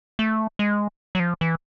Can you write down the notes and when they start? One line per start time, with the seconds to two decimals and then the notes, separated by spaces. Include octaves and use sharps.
0.19 A3
0.59 G#3
1.15 F#3
1.20 F3
1.41 E3